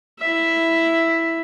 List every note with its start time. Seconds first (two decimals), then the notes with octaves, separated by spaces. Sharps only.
0.20 E4 E5